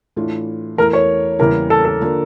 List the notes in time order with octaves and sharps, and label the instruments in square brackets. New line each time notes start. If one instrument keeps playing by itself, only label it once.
[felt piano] A2 E3 A3 D4 F4
[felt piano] E2 E3 A3 E4 [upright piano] A#4
[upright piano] C#5
[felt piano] E2 C#3 G3 A#3 E4 [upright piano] A#4
[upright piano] A4
A4
[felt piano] D3 F3 A#3 D4